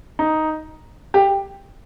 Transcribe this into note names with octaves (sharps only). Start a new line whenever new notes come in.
D#4
G4